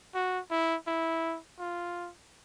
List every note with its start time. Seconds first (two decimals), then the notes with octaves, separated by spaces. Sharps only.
0.14 F#4
0.50 E4
0.87 E4
1.59 F4